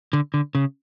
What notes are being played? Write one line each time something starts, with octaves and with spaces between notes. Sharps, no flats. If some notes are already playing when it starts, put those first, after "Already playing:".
D3
D3
C#3